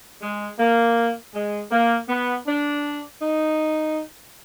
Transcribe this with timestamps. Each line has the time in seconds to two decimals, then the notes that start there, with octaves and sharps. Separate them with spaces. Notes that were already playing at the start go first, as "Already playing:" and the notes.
0.21 G#3
0.58 A#3
1.34 G#3
1.71 A#3
2.08 B3
2.47 D4
3.21 D#4